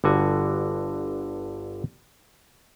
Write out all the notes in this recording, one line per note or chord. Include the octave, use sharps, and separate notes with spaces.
G1 G2 D3 F#4 G#5